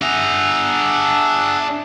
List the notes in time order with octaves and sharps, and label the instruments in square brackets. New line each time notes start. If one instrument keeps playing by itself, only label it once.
[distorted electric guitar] D4 A#5 [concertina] G#4 E5 F#5